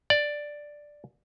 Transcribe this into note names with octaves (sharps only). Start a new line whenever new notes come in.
D5